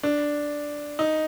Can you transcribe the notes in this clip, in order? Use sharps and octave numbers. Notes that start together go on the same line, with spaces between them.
D4
D#4